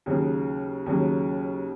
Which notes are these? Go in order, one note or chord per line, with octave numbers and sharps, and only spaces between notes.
D#2 C#3 F#3
D#2 C#3 F#3